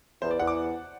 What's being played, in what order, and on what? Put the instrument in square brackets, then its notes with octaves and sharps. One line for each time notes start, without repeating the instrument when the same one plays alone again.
[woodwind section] E2 [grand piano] C5
[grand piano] D5
[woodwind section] E2 [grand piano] F#5
[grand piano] D6